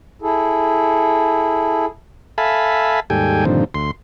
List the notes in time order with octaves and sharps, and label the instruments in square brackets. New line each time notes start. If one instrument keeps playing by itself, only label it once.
[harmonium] E4 G#4 A4
[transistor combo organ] A4 E5 F5 G#5 A5 B5
D#2 G#2 G3 A4 G5 G#5
G2 A#2 D3 D#3 F3 C4
D2 C6